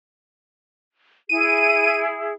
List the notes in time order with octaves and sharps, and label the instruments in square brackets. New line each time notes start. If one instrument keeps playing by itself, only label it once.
[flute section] E4 G#4 [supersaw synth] D#7